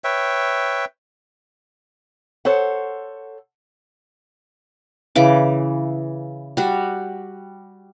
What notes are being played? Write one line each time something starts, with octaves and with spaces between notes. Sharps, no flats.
B4 C#5 E5 G5
A4 C5 C#5 F#5
C#3 E3 D6
G3 F#4